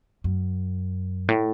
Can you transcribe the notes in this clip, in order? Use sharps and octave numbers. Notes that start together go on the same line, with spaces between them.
F#2
A2